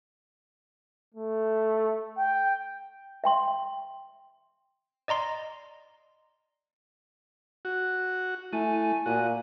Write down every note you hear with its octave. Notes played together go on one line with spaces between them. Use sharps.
A3
G5
E5 G5 C6
D5 D#5 A#5 C6
F#4
A3 E4 G#5
A#2 F#4